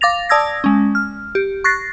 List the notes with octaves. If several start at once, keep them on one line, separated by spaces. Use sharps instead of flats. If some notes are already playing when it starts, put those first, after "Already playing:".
F5 D6 A6 A#6 F7
D5 A5 D#6 E6 G#6 A#6
G#3 C#4
F6
G4
C#6 F#6 A6 A#6 C7